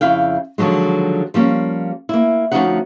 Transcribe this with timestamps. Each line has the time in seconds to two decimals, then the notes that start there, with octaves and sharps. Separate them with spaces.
0.01 F2 C#3 E4 F5 G5
0.58 D3 D#3 F3 F#3 G#3
1.34 F3 G3 A#3 C#4
2.09 A#3 E4
2.51 D2 E3 F3 C#4 D#4 F#5